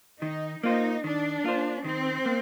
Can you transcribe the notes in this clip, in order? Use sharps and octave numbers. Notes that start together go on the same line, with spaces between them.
D#3 D#4
A#3 D#4 F4 C5
D#3 D4
A#3 F4 C5
D#3 C4
A#3